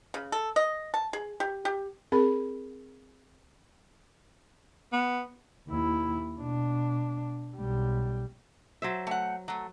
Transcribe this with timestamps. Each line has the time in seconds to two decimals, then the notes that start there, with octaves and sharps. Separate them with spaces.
0.14 C#3
0.32 A4
0.56 D#5
0.94 A5
1.13 G#4
1.40 G4
1.65 G4
2.12 C4 G#4 A#4 B5
4.93 B3
5.68 D#2 E4
6.39 B2 D4
7.56 B1 G3
8.82 F#3 C5 E5
9.07 A3 F#5
9.48 F#3 A3